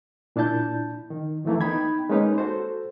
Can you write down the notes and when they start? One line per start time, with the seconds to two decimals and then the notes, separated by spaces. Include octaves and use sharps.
0.36 A#2 D4 E4 A5 G6
1.10 D#3
1.44 F2 D#3 E3 A3 A#3
1.61 B3 D#4 G5 B5 G#6
2.09 G#3 A#3 C#4 D#4 B4 C#5
2.38 F#4 A4 C5